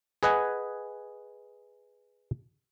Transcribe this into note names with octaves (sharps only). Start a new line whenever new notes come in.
G#4 B4 D#5 F#5 G#5